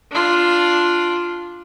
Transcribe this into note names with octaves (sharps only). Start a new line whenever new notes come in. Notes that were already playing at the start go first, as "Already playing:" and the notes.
D4 F4